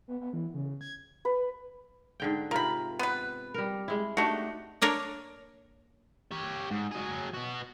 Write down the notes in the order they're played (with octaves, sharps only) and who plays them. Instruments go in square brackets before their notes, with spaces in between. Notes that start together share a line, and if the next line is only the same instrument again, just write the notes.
[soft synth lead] B3
B3
E3
C#3
G#6
[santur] B4
[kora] G#2 D3 G5
[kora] C3 F4 [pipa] A#4 B5
[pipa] B3 B4
[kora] G3 A#4
G#3 E4
[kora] A3 D#4 G4 [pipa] D4 F#4
[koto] A#3 D4 A#4 C#5
[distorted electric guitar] G4 C#5
G#2
F#3 G#4
B3 F#4